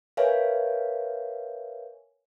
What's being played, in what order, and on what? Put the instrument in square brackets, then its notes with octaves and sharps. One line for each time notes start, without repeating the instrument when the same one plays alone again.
[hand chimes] A#4 B4 C#5 E5 F5 G#5